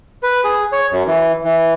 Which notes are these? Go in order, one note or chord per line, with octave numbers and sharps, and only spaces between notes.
B4
G#4
C#5
F#2
E3
E3